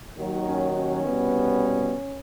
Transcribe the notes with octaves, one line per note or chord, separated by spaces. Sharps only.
D#2 D#3 F#3
C#4
C#4
C2 B2 G3 B3